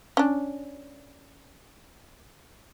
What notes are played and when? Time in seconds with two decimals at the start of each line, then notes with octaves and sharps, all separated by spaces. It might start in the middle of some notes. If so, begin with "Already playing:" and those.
0.17 C#4 D4